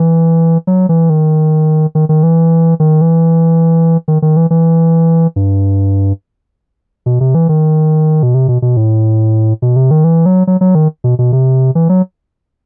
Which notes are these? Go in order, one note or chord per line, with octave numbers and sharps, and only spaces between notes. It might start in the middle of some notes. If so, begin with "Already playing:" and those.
Already playing: E3
F#3
E3
D#3
D#3
D#3
E3
D#3
E3
D#3
D#3
E3
E3
G2
B2
C3
E3
D#3
B2
C3
B2
B2
A2
B2
C3
D#3
E3
F#3
F#3
F#3
D#3
B2
B2
C3
E3
F#3